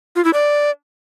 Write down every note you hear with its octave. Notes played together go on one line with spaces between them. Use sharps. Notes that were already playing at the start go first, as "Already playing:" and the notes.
F4
E4
D5